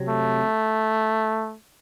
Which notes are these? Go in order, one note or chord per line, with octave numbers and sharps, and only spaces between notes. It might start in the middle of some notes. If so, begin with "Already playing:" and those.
Already playing: C3 F#3 C4
A3